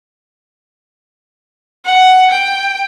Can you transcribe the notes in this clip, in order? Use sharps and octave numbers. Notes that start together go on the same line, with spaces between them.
F#5
G5